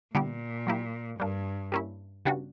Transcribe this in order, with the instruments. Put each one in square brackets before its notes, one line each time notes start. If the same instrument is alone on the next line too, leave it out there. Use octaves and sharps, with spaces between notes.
[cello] A#2 [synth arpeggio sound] D3 G3 B3 E4 G4
[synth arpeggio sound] F#3 A#3 E4 G4
[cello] G2 [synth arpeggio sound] G3 A#3 D4
[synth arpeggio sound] G3 A#3 C#4 E4
C#3 G3 B3 D4 F#4